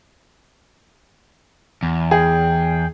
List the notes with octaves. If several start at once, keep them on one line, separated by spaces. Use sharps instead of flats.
E2
G#4 G5